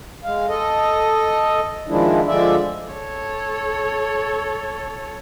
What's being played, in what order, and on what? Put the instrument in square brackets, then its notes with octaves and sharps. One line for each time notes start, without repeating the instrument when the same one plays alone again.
[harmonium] G#3 F5
A4 D#5
D#3 F3 G#3 D4 E4
D3 F3 G#3 D5 E5
[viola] A4 C#5